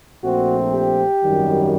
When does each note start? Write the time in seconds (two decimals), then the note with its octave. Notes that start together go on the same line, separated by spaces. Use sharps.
0.22 A#1 A#2 F3 A3 C4 F#4
0.72 G4
1.24 G#1 F#2 D#3 G3